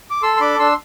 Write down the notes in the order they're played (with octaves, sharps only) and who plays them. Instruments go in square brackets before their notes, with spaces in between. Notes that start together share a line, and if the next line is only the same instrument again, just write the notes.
[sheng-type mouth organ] D6
A4 C6 E6
C6
D4 B5 D6
D4 C6 E6